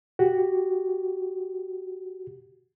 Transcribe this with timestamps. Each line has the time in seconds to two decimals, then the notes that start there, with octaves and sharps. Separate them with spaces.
0.19 F#4 G4